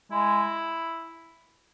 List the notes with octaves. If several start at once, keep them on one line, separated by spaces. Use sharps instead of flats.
G#3 E4